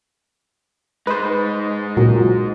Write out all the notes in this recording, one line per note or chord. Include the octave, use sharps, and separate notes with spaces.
G#3 D#4 B4 C5
C#2 A#2 F#3